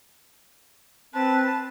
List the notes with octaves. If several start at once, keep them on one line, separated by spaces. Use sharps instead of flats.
C4 B4 A5